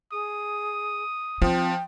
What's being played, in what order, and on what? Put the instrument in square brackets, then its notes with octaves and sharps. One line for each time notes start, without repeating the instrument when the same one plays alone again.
[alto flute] G#4 [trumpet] D#6
[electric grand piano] F3 [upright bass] C4 [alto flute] G5